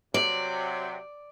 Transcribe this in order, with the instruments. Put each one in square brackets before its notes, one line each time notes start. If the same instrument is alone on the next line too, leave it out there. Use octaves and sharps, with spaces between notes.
[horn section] C3 F#3 [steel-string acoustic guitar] D5